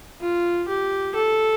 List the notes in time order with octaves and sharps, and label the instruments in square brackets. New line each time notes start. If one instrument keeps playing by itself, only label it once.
[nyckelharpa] F4
G4
A4